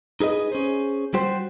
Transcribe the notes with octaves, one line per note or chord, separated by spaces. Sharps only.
D#4 G#4 B4 D#5
C#4 G#4 C5
G3 F#4 G4 C5